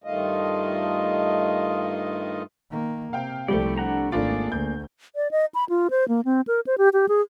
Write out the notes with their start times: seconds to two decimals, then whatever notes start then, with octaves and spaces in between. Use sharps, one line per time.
0.04 G2 D#3 A3 F4 D#5
2.71 D#3 A#3
3.13 C3 F5 G5
3.48 C2 F3 G3 A3 G4 D5
3.78 D4 F#5 A#5
4.12 G#1 A3 A#3 D4 F4 G#4 D5
4.52 D2 G6
5.16 D5
5.31 D#5
5.55 B5
5.69 F4
5.90 C5
6.08 A#3
6.25 C4
6.47 A#4
6.67 C5
6.78 G4
6.93 G4
7.09 G#4